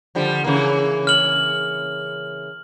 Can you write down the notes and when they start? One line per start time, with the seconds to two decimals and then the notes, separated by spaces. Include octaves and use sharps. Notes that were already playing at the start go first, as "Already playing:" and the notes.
0.15 D3 F3 G3
0.44 C#3 E3 A#3
1.07 F6 F#7